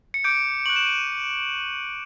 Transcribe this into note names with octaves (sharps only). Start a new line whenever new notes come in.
C#7
D6 G6 D7
C#6 F#6 F#7
E7
D#7